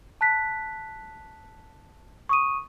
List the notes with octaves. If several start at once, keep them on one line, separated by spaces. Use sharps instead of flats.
A5 F#6 B6
C#6 D#6 D#7